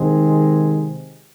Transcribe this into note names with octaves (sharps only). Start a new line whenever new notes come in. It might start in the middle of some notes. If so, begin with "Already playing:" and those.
Already playing: C3 D#3 G#3 C4